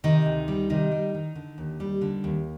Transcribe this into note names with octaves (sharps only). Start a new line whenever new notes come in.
C3 D#3 D#4
D2
G3
C3 D#3 D#4
G3
D#3
D3
D#2
G3
D3
D#2